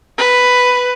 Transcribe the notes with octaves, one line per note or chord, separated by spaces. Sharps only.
B4